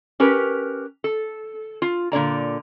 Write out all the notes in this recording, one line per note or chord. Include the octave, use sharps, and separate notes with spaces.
C#4 G4 A#4 B4
A4
F4
A#2 D3 D5 A#5